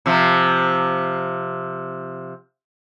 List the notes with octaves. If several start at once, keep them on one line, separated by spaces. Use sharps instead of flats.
C3 F3